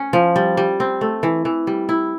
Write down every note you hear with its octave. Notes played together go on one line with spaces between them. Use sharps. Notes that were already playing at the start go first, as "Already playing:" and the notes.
Already playing: C#4
F3
G3
G3
C4
A3
E3
E3
G3
E4